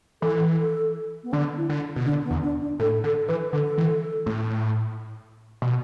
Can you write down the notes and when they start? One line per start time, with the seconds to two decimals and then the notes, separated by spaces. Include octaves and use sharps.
0.22 E3 A4
0.59 A4
1.24 B3
1.33 D3 D4
1.57 E4
1.69 D3
1.96 B2
2.06 D3 D4
2.24 B3
2.31 E2
2.42 D4
2.61 D4
2.80 A2 A4
3.04 D3 A4
3.28 E3 B4
3.53 D3 A4
3.78 E3
4.26 A2
5.62 B2